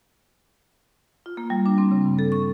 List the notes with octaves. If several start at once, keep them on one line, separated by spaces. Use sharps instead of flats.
F4
A#3
G3
D4
C4
C#3
G2
A4
C#6